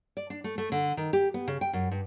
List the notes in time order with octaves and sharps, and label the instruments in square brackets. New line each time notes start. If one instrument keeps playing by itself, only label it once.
[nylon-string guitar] D5
D4
A3
A3
D3
D#3
G4
B3
C#3
G5
F#2
G2